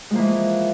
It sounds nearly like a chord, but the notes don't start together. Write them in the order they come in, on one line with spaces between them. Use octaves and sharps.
G#3 F3 A#3 E3